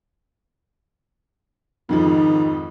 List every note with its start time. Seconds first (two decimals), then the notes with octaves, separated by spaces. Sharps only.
1.89 F2 G#2 D#3 F3